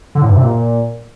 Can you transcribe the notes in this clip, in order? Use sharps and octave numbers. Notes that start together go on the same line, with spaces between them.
D3
A2
G2
C3
A#2